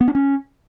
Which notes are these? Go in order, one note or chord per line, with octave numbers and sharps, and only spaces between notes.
B3
D4
C#4